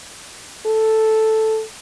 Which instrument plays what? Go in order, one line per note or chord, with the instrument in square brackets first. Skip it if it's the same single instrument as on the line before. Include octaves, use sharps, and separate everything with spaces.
[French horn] A4